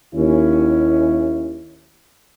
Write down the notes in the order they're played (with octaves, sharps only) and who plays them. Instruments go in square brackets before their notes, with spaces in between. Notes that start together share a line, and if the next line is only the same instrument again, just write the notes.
[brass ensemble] D#2 C#4 E4